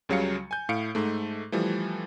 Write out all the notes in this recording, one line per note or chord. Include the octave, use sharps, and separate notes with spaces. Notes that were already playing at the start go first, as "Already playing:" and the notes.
C#2 C#3 F#3 G3 F5 C#7
G#5 G6
A2 F5 C#7 D7
G#2 A3
E3 F3 G3 A3